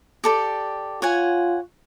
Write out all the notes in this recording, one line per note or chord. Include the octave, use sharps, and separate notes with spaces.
G4 A4 D5
F4 C#5 F#5 G#5